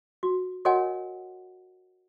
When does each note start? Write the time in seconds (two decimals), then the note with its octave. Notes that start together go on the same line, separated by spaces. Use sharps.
0.23 F#4
0.65 F#4 A#4 C#5 D#5 F#5 G#5